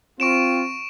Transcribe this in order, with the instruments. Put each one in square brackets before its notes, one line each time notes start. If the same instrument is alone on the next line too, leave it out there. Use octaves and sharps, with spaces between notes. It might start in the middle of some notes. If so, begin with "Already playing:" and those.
[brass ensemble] C4 F4 [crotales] C#6 D7 E7